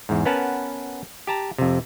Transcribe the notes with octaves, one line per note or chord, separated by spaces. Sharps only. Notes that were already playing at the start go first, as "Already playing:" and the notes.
E2 G#2
B3 C#4 A#4 B4 F#5 A5
G4 A5 A#5
F2 C3